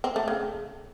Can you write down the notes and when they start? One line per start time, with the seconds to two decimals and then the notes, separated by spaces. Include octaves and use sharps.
0.04 C4
0.16 A3
0.28 C#3